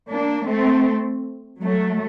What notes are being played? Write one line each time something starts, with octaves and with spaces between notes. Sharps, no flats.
A#3 D4
A3 C4
F#3 A3